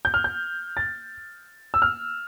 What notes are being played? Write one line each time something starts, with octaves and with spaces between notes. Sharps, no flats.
G6
F6
G6
A6
E6
F6